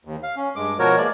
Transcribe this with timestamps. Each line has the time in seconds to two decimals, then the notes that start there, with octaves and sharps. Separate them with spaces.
0.05 D#2
0.23 F5
0.36 C#4
0.56 G2 G#3 D6
0.79 B2 F3 F#4 A#4 C#5
0.98 G#3 A#3 D5